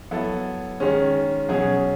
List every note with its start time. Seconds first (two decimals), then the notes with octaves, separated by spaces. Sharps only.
0.11 F#3 B3 E4 A4
0.80 D#3 G#3 C#4
1.48 B2 F#3 C#4 G#4